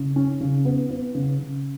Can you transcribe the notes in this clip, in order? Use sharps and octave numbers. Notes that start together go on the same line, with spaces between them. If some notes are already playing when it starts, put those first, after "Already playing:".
Already playing: C#3
C#4
C#3
B3
B3
C#3
C#3